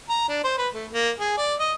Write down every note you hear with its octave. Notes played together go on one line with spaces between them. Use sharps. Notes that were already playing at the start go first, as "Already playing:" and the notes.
A#5
D4
C5
B4
A3
A#3
G#4
D5
D#5